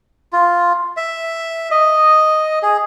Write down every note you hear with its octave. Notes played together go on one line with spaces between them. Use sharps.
F4
E5
D#5
G#4